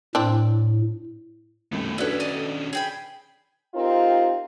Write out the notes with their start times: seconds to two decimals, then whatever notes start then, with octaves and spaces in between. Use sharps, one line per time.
0.15 A2 C4 D4
1.72 C2 F#2 B2 D#3 A3
1.98 D#3 C#4 D4 E4 F#4 A4 B4
2.20 D5 D#5
2.73 G#4 G5 B5
3.75 C4 D#4 F4 G4 A#4